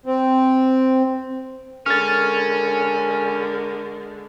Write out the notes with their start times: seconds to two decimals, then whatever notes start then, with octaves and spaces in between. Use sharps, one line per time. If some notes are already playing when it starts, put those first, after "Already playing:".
0.06 C4
1.86 D3 G#3 C#4 A#4 F6 A6